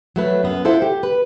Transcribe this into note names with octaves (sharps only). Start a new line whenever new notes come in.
F#3 A3 B4
F#2 B3
E4 F4 A4 C5 F#5
G4
B4